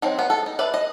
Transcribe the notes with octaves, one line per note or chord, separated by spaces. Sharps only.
F#3 C4 D#4
B3
A4
D#4
B4 D5 E5
D#5